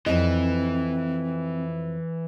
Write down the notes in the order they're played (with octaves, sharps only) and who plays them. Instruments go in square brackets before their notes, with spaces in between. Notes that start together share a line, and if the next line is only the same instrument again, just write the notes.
[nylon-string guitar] F2 D#5 [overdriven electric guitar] E3 [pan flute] C4